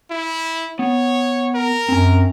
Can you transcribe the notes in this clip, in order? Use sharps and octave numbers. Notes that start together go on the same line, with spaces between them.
E4
B3 C#5
A#4
F#2 C4 G#5